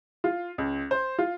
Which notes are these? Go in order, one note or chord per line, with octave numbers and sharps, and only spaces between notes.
F4
C#2
C5
F4